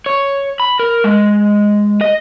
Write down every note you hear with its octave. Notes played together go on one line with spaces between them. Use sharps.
C#5
B5
A#4
G#3
D#5